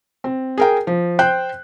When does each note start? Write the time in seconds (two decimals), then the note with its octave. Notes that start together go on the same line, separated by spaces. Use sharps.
0.24 C4
0.58 G#4 A#4 G5
0.87 F3
1.19 C5 G5 F#6 G6